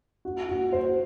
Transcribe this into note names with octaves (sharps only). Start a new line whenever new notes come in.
F#4
F#4
C5